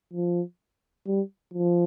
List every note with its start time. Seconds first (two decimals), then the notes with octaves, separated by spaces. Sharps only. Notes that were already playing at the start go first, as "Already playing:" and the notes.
0.14 F3
1.07 G3
1.54 F3